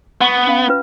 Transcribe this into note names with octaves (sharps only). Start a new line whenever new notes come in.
B3 F#5 C#6
C#4 F5
C#4 F4 B4